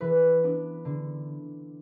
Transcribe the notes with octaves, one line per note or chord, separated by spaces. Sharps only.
E3 B4
B3 D4
D3